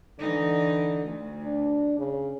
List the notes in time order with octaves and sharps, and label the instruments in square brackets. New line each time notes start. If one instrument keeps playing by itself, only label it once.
[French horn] D3 [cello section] E3 D#4
[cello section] D2
[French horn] D4
C#3